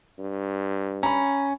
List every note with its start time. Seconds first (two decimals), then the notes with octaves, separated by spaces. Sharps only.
0.19 G2
1.03 C#4 A#5 B5